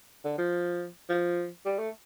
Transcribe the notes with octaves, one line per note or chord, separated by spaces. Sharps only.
D3
F3
F3
G3
A3